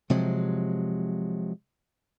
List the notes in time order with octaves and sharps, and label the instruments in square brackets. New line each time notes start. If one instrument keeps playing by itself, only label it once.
[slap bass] C3 F3 F#3 G#3